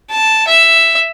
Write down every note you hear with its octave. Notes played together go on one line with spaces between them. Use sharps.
A5
E5